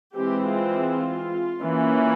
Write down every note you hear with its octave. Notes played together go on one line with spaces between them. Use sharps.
E3 G#3 C4 G4
F4
E3 A#3 C#4